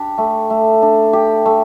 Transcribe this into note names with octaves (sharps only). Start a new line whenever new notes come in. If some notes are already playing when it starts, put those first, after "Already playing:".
Already playing: D4 G4
A3
A3
D4
G4
A3